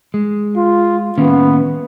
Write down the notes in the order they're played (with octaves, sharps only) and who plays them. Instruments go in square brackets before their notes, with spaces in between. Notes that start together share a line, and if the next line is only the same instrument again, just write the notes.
[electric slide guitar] G#3
[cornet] F4
[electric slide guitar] D#3 A#3 C#4 [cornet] B3